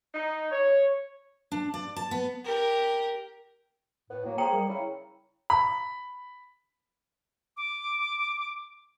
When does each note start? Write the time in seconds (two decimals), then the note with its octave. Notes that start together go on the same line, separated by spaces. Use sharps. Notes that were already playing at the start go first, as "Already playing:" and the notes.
0.14 D#4
0.51 C#5
1.52 D4
1.74 D5
1.96 A5
2.11 B3
2.44 G4 A#4
4.10 A2 B3
4.25 F#3 A#3
4.38 F3 G#4 G5 A#5 C#7
4.52 G3 A#3
4.68 C#3 E4
5.50 B5
7.57 D6